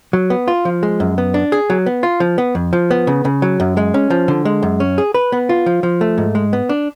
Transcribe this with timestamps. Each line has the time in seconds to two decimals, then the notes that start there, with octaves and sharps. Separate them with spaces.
0.13 F#3
0.30 B3
0.48 F4
0.65 F3
0.83 G#3
1.00 F#2
1.18 B3
1.34 D4
1.52 G#4
1.70 F#3
1.86 B3
2.03 F4
2.20 F3
2.38 B3
2.55 F2
2.73 F3
2.91 B3
3.07 C#3
3.25 C#3
3.42 F#3
3.60 F#2
3.77 G#3
3.94 C#4
4.10 F3
4.28 D3
4.45 G#3
4.63 F#2
4.80 C#4
4.98 G#4
5.14 B4
5.32 B3
5.49 F4
5.66 F3
5.83 F3
6.01 A3
6.18 G#2
6.35 G#3
6.53 B3
6.69 D4